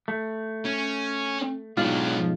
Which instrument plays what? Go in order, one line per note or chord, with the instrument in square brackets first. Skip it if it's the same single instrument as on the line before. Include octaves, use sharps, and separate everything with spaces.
[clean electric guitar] A3
[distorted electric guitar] C#4
[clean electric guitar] B1 G#2 F4 [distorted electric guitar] F#3 D4